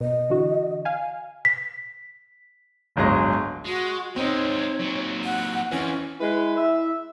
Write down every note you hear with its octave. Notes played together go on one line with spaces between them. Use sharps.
B2 D#5
D3 E3 F#4
F5 G#5
B6
D1 G1 F#3 G#3 A#6
G#3 F#4
C3 G#3 C4 D#4 C#5
A#2 F#3
F#5
F2 E3 C#4
G#3 E4 B4
E5